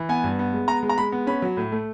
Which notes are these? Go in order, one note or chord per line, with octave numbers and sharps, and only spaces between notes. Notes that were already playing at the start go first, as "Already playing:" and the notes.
Already playing: E3
B3 G#5
G2
B3
G#3
B3 A#5
G#3
A#5
G#3 B5
B3
C#4 B5
F#3
A2
A3